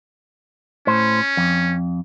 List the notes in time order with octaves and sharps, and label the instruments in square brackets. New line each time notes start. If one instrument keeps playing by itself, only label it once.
[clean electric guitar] A2 C5 [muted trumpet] C#4
[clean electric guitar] F2